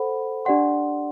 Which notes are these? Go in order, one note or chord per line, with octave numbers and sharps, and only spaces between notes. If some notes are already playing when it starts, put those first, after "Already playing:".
Already playing: A4 C5 F#5 B5
D4 G4 D5 F#5 C6